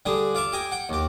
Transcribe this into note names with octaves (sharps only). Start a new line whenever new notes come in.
D3 G3 G#4
F4 D5 E5
G4 D#5 G5 G#5
F#5 G5
D#2 G4